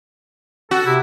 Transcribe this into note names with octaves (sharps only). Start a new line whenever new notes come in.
F#4 A4
C3 E4